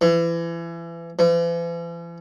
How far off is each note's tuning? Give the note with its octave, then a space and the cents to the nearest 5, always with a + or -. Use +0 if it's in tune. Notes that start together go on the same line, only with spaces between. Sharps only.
E3 +30
E3 +45